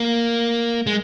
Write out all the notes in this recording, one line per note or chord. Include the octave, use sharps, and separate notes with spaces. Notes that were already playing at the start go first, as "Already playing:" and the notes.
Already playing: A#3
G#3